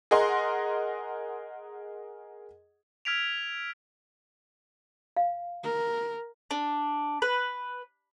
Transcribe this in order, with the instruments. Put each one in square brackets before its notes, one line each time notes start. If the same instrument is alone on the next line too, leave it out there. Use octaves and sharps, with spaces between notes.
[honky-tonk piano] G#4 A#4 D#5 F#5 C6
[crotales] E6 F6 G#6 B6 D7 F7
[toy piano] F5
[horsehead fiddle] A#4
[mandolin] D4
B4